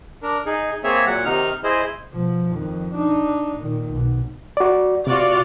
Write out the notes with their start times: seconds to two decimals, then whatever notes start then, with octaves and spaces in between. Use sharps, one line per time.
0.22 D4 A#4
0.46 D#4 G#4
0.84 A#3 C4 G#4 C#5 E5
1.06 A#2 F#3 F#5
1.25 C3 D#3 D#4 F6
1.64 E4 G#4 C5 D#5
2.12 B2 F3
2.52 F2 D#3
2.94 D4 D#4
3.57 A#2 D#3
3.92 B1
4.57 F#4 D5
5.07 C3 F4 F#4 D5